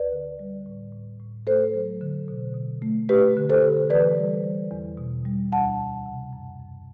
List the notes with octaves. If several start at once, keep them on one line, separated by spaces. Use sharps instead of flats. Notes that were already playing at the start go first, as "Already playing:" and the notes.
Already playing: D2 B4 D5
D3
G3
A2
A2
A2
A3 A4 C5
F#3
D3
B2
B2
A3
A3 G4 B4
D3
A4 C5
D3
E3 B4 D5
G3
G3
E2
B2
G3
D2 F#5 A5
D2
C3
F#2
F#2